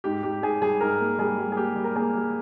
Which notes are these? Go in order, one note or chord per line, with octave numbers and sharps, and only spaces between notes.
G#2 G4
G#2 G4
G#2 G#4
G3 G#4
G#2 A#4
A#3
G3 G#4
G3
G#4
A#3 G4
G3
A#4
A#3 G#4
G3